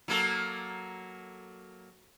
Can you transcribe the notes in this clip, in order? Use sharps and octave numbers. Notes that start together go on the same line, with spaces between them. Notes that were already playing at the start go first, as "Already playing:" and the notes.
F#3 A#3 A4